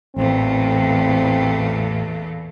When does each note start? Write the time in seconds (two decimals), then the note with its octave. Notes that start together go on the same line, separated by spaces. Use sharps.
0.16 A1 E2 A#2 A3 C4